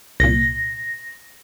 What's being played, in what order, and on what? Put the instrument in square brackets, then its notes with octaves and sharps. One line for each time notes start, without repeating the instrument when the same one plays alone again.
[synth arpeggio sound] C2 A#2 [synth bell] A#6